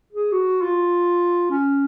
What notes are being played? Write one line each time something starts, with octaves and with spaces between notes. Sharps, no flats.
G#4
F#4
F4
C#4